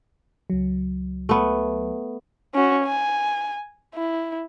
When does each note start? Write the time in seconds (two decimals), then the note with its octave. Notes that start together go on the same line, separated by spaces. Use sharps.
0.50 C#2 F#3
1.29 A3 B3
2.55 C#4 F#4
2.85 G#5
3.95 E4